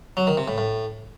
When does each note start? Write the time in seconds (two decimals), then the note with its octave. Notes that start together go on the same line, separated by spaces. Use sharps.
0.17 F#3
0.27 D#3
0.37 C3
0.48 A2
0.58 A2